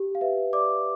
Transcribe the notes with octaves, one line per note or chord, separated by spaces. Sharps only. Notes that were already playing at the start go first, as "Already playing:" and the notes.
Already playing: G4
F5
B4 E5
D5 D6